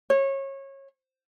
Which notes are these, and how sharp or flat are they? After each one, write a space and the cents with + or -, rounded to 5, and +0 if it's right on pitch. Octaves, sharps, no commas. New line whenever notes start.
C#5 -25